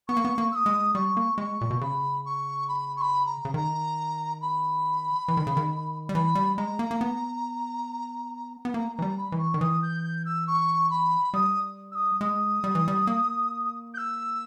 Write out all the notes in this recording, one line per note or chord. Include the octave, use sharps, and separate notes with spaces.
B3 C#6
A#3
B3
A#3
E6
D#6
G#3
G3 C#6
A#3
G#3 C#6
A#2
B2
C#3 B5
C#6
B5
C#6
B5
A#5
C#3
D#3 A#5
B5
E3
D#3
C#3
D#3
G3
E3 B5
G3
G#3 A#5
A#3
A#3
B3
B3
A#3 A#5
E3 A#5
G3
B5
E3
C#6
D#3
E3 D#6
G6
G6
E6
C#6
B5
G3 D#6
E6
D#6
G#3 D#6
G3
E3
G3
A#3
G6
E6